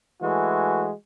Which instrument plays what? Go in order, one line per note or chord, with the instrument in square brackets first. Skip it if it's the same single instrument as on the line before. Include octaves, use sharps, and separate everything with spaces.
[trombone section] E3 G#3 A3 F#4